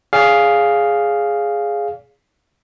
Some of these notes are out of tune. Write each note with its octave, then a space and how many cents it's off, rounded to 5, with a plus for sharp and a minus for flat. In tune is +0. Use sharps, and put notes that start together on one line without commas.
G#4 +0 D5 -40 F5 +0